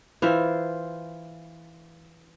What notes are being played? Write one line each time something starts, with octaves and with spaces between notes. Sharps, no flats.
E3 F4 C5 E5